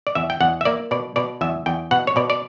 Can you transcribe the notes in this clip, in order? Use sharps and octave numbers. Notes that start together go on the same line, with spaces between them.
D5
E2 E5
G5
E2 F#5
E5
A#3 D5
B2 D5
B2 D5
E2 E5
E2 G5
B2 F#5
C#5
B2 D5
D5